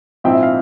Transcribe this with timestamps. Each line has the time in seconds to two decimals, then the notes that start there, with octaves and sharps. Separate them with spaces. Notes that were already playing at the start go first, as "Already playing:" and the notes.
0.24 A#1 G#2 F3 C4 E4 G5
0.32 E5
0.43 F5